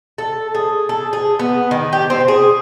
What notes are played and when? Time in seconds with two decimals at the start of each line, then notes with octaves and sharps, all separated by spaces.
0.18 A4
0.55 G#4
0.89 A4
1.13 G#4
1.39 B3
1.71 D#3
1.93 G4
2.10 C4
2.28 G#4